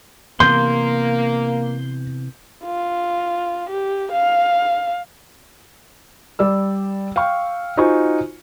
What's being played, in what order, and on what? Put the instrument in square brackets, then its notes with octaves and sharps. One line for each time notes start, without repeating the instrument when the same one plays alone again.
[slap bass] C3 E3 B3 [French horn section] A#3 [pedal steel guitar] C6 [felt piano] G6
[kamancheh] F4
G4
F5
[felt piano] G3 D5 E6
F5 G5 C#6
D#4 F4 F#4 C5 G#5 C#6